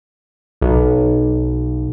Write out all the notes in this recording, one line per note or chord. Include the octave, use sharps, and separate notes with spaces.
B1